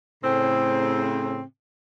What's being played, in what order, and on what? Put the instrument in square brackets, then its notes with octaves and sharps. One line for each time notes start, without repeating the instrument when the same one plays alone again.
[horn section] A2 C#3 C4